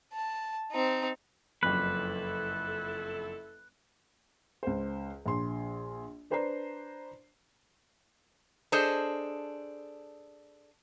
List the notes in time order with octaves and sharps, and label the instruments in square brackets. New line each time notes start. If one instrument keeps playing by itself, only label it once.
[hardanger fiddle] A5
C4 D#4
[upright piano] F#1 F2 [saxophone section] E4 A4 [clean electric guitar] B4
[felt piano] C#2 C5
A#1 C6
D4 B4 C5 D5 A#5 C7
[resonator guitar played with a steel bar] D4 G#4 A4 C5 D#5